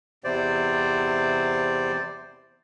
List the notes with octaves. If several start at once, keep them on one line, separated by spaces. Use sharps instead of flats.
E2 C3 C5 D5